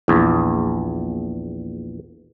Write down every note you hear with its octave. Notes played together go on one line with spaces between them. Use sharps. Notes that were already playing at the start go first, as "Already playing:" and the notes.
A#1 E2